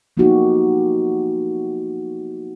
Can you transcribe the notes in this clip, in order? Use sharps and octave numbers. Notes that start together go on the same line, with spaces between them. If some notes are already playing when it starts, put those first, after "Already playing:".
F3 A#3 B3 D#4 F#4 G4